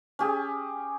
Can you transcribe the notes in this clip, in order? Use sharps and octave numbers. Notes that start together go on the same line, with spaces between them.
C#4 G4 G#4